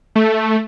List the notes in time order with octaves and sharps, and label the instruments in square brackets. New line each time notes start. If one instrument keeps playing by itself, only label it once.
[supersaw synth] A3